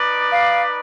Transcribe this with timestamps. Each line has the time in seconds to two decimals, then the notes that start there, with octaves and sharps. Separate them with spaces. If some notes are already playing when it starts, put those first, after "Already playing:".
Already playing: D#4 B4 D5
0.32 F5